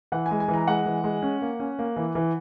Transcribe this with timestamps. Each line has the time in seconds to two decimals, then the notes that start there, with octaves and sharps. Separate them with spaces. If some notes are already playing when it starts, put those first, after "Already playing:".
0.12 E3 F#5
0.26 G#5
0.31 G#3
0.40 G#5
0.48 E3
0.54 A#5
0.67 G#3 F#5
0.86 E3
1.04 G#3
1.22 C#4
1.42 A#3
1.60 C#4
1.79 A#3
1.96 E3
2.15 E3